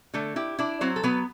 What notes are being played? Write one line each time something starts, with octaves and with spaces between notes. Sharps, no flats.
D3 A3 A4
E4 G4
D4 E4 D5
F#3 C4 C5
A4
F#3 B3 B4